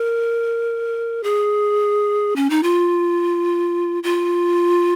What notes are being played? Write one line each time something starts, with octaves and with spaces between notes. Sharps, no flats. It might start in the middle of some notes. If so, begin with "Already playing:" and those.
Already playing: A#4
G#4
C#4
D#4
F4
F4